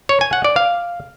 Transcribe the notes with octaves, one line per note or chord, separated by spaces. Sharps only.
C#5
G#5
F#5
D5
F5